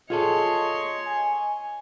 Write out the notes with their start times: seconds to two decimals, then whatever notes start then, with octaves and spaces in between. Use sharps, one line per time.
0.10 F4 G#4 A4 C#5 D#5 C6
1.06 G#5